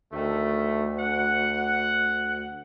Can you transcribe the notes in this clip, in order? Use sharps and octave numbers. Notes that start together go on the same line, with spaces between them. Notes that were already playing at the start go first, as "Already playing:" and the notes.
D2 D#3 A3
F#5